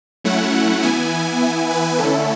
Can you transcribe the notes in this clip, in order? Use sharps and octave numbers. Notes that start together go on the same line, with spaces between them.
F#3 A3 C#4 E4 F#5
F#5
E3 B3 E4 G#5
G#5
E3 B3 E4
B4
D3 A3 C#4 E4 A4